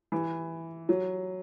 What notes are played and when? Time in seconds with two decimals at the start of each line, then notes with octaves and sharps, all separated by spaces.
0.12 E3
0.89 F#3